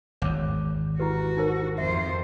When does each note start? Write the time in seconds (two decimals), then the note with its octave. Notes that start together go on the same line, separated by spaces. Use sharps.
0.22 G#1 E2 C#5 D6
0.99 E4 F#4 G4 B4
1.37 D#4 A#4 C5
1.78 F2 C5 E5